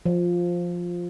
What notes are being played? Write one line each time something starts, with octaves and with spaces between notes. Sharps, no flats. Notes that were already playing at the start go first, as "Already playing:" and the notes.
F3